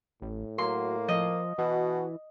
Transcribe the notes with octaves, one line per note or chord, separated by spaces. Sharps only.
A1 A2
F#3 A#3 C6
F3 D#5
B2 E3 F#4